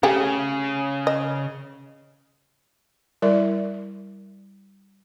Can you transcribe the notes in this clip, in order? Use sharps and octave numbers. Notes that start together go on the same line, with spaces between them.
C#3 A3 G4 G#4
D#5
G3 E4 A#4 D5 E5